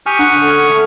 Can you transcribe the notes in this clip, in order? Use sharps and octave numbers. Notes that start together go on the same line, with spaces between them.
G4 G#5 C#6 D#6 F6
D4 F#5
D3
C#4
A3